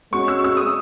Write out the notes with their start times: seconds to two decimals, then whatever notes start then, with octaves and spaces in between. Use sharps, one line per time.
0.13 G#3 C#4 F#4 C#6
0.28 E6
0.44 E6
0.57 D#6